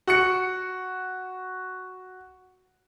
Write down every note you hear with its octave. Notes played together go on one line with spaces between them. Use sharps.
F#4 F#6 C#7